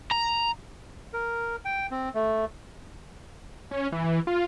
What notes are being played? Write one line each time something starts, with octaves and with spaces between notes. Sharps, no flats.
A#5
A#4
G5
C4
A3
C#4
E3
E3
F4